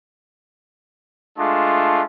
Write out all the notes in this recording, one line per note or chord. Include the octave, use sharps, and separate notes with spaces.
G#3 A3 D4 F4